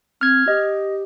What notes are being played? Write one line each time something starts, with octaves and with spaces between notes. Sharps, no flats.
C4 F6 G#6
G4 D#5